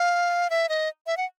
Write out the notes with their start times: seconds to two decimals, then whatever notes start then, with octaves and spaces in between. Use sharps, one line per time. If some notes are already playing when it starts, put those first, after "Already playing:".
Already playing: F5
0.50 E5
0.69 D#5
1.07 E5
1.17 F#5